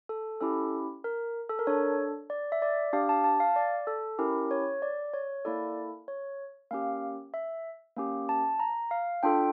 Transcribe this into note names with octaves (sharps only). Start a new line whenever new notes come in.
A4
C#4 E4 G4 A4
A#4
A4
A#4
D4 A4 C#5
D5
E5
D5
D4 G4 F5
A5
A5
F5
D5
A4
C#4 E4 G4 A#4
C#5
D5
C#5
A#3 E4 A4 D5
C#5
A#3 C#4 G4 F5
E5
A#3 C#4 G4
A5
A#5
F5
D4 F4 A4 G5